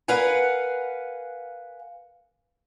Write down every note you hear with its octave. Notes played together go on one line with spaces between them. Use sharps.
A#4 B4 F5 F#5 G#5